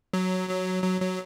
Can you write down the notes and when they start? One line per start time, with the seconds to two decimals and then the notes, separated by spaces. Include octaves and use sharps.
0.13 F#3
0.49 F#3
0.83 F#3
1.01 F#3